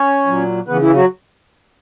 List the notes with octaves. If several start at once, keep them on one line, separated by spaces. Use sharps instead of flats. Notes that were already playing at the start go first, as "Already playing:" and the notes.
Already playing: C#4 C#5
A#2 F#3
C#3 E3 B3 B4
E3 E4
F#3 F#4